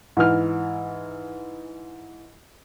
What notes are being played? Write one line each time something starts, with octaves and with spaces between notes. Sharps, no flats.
G#2 E3 F6